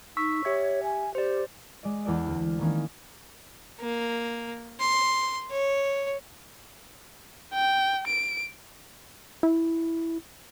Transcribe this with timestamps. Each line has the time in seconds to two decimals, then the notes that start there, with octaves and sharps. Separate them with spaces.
0.17 D#4 C#6 E6 B6
0.45 G4 C#5 E5 G#6
0.84 G#5
1.15 G4 C5 D5
1.83 G#3 D5 D#5
2.05 E2 A4 D5 F#6
2.27 D2
2.59 D#3 E3 A#3 C#4 D#4
3.80 A#3
4.80 C6
5.51 C#5
7.54 G5
8.07 D7
9.43 E4